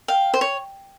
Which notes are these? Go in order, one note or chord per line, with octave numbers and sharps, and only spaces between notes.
F5 G5
C5
C#5